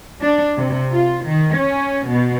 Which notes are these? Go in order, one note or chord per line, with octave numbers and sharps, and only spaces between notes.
D4
C3
F4
D#3
C#4
B2